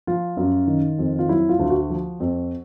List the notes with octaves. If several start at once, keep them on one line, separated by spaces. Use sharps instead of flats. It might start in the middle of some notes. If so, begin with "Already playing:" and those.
F3 F4
F#2
D#3
F2
F4
F#3 E4
F4
D2
F#4
F3
F2